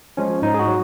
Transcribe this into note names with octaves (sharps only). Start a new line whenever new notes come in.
F3 G#3 C#4
G#2 D#4
G#4
F#4
F#3